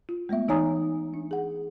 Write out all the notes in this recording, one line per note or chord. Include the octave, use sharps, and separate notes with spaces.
F4
G#3 A3 B3 E5
E3 D#4 C#5 G#5 A#5 D#6
D4
G#4 F#5